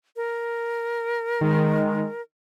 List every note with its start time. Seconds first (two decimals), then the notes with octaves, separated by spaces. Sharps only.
0.16 A#4
1.41 D#3 G#3